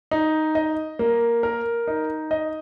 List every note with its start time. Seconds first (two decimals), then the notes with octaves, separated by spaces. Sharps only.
0.11 D#4
0.55 D#5
0.99 A#3
1.43 A#4
1.87 D#4
2.31 D#5